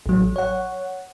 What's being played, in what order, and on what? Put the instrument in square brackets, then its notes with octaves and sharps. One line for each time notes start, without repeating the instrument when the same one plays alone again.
[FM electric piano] A1 F#3
C#5 F#5